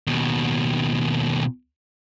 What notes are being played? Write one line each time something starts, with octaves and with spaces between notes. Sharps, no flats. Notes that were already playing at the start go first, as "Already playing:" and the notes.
D#2 B2